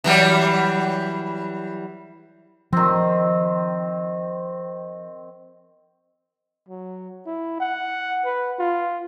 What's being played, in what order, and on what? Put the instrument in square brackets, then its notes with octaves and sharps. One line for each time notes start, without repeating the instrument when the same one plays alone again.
[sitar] E3 F#3 G3
[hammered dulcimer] D#3 C4 [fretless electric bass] F3
[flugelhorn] F#3
E4
F#5
B4
F4